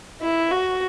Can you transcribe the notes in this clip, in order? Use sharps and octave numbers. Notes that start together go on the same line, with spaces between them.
E4
F#4